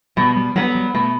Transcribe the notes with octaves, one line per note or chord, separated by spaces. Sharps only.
B2 G3
G3
F#3 G3 B3
G3
B2 A3